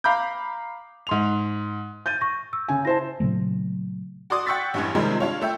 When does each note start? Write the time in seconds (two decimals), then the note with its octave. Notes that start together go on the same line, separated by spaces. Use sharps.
0.04 F5 A#5 B5 D6 G6
1.07 G#2 C6 F7
2.06 G6 A6 D#7
2.21 C#6 A#6
2.53 E6
2.68 C#3 G#5
2.85 E4 C5 A5 A#6
3.20 A#2 C#3 F#3 A3
4.30 F#4 D5 C6 D6 D#6
4.46 F#5 G5 C#6 E6 A6 B6
4.74 A1 G2 E3
4.95 C3 D#3 F3 G3 G#3 C4
5.20 D4 F4 C#5
5.41 A3 E5 G5